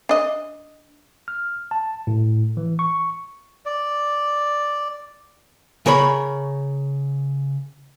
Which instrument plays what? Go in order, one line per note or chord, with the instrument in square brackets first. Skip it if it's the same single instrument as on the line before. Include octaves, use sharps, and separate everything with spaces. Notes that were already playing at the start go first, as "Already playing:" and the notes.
[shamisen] D4 D#5
[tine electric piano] F6
A5
A2
E3
C#6
[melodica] D5
[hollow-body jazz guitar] C#3 A#4 C#5 B5